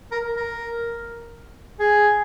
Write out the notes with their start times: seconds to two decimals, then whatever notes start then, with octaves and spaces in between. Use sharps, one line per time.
0.11 A#4
0.36 A#4
1.80 G#4